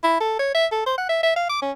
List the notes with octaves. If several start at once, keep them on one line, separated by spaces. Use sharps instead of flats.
E4
A4
C#5
E5
A4
C5
F#5
E5
E5
F5
D6
C#4